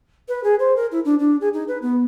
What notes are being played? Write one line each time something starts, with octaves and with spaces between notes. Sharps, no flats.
B4
G#4
C5
A#4
E4
D4
D4
G#4
D#4
B4
B3